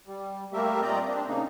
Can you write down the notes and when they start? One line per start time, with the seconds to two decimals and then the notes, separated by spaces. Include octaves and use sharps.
0.07 G3
0.53 G3 A3 A#3 G4 A#4 E5
0.82 A#2 C4 D5 D#5 A#5 G6
1.08 C4 D4
1.28 C#3 A#3 D#4